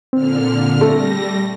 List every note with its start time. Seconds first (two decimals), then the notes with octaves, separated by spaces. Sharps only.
0.13 A#2 D3 C4 F6
0.81 G3 A3 A#6